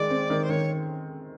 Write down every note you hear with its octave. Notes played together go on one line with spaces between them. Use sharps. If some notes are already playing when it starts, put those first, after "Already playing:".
Already playing: D#3 G#3 D5
C4
D#3
C5
D#3 C#5